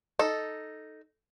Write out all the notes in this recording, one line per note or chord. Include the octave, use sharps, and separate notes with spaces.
D#4 A4